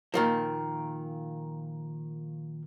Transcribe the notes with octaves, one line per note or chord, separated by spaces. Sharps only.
A#2 D#3 F3